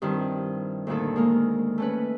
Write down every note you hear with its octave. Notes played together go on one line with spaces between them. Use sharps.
G2 D#3 C4 E4
D2 A#2 D#3 A4
G#3 A#3 A#4
A3 C#4 B4